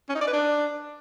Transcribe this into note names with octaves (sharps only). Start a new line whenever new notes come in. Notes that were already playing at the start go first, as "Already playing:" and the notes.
C#4
D#4
D5
B4
D4